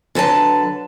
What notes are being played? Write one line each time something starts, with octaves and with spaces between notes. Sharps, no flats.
D3 F#3 B4 A5